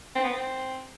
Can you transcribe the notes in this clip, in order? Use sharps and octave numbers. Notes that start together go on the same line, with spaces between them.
C4
B3
C4